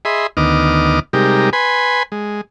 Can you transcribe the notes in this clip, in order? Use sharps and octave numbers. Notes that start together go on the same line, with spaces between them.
G#4 D#5 E5 B5 C6
D2 D#3 B3 D#5 D6 F6
C3 G3 G#3 D#4 G4 A#4
B4 G#5 B5 C6
G#3